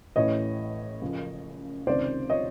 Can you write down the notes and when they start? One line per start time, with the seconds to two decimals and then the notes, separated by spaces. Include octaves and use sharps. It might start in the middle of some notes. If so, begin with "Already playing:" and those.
0.16 A1 A2 E3 C#5 D#5
1.02 F#1 F#2 C#3 F3
1.87 C#2 C3 D#3 C5 D5
2.30 C#5 D#5